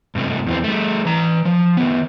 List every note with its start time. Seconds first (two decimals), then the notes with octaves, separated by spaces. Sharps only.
0.15 G2 C3 A3
0.46 E2 E3 C4
0.64 G3 A3
1.05 E3 A#5
1.45 F3
1.77 D#3 B3